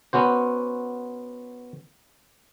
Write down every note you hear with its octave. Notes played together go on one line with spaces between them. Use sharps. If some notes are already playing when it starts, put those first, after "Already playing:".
B3 C#4 F#4 C5